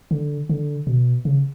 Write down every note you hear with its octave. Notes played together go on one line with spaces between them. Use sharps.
D3
D3
B2
C#3